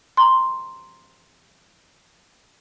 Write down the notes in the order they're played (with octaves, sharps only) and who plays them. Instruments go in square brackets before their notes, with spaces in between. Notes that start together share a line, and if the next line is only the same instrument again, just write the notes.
[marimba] A#5 C6